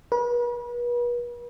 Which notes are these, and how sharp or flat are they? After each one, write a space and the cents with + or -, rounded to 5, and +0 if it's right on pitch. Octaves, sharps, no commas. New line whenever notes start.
B4 -40